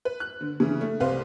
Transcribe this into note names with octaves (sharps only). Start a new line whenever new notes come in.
B4
F#6
D3
C#3 E3
A3
C2 G4 B4 C5 F5